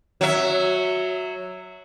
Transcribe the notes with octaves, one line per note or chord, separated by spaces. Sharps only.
F#3 E5